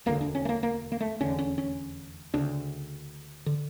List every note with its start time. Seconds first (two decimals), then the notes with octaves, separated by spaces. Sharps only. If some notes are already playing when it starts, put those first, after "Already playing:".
0.06 E1 D2 D3 A#3
0.21 D4
0.35 C#4
0.45 A3
0.49 A#3
0.63 A#3
0.92 A#3
1.01 A3
1.20 F1 E2 D3 C#4
1.39 C#4
1.58 C#4
2.34 D2 C#3 D4
3.46 D3